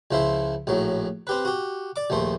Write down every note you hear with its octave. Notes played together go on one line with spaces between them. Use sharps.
C#2 F3 E4 C5 E5
A#1 A2 F#3
C4 G4 B4
F#4 G4
D5 D6
A#1 D#2 A3 C5